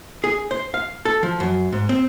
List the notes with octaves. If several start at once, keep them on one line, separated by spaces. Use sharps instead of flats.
G#4
C5
F5
A4
F3
F#2
G#2
C4